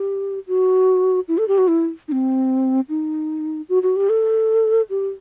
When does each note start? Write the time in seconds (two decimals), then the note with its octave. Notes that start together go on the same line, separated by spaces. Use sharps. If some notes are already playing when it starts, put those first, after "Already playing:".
Already playing: G4
0.47 F#4
1.28 E4
1.38 A4
1.48 G4
1.58 F#4
1.68 E4
2.08 D#4
2.12 C4
2.89 D#4
3.69 F#4
3.83 F#4
3.96 G4
4.09 A4
4.90 G4